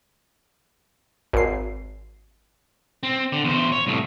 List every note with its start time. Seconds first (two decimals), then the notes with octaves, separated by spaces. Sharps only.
1.33 G#1 C7
3.03 C4
3.33 D3
3.44 E2 C5
3.72 C#5
3.87 C2 A2